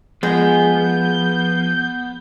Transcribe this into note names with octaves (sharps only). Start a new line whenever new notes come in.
F3 G#3 B3 G6